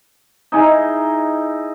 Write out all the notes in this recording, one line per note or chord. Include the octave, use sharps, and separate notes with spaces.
D#4 E4 G#4